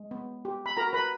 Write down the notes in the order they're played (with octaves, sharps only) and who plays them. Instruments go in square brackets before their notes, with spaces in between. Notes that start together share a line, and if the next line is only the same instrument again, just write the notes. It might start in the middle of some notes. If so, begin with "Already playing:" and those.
Already playing: [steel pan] G#3
B3
G4
B5
F#4 A#4 A#5
B4 B5